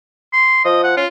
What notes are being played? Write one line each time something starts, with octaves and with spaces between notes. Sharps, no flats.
C6
F3 D#5
F#5
C#4 F4